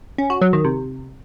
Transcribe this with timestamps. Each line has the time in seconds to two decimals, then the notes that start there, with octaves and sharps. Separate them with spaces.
0.18 C#4
0.30 F#4
0.42 F#3
0.53 D#3
0.65 C3